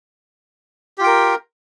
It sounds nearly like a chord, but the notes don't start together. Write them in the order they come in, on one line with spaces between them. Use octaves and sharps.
G4 F4 G5 A#4